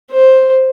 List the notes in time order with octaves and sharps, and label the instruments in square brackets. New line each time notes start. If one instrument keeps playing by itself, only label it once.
[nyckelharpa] C5